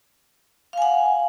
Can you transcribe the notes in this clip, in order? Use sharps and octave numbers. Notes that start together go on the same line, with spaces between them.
F5 F#5 G#5